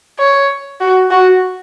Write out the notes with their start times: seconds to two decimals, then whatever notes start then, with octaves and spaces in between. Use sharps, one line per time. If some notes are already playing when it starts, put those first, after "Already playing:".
0.19 C#5
0.81 F#4
1.11 F#4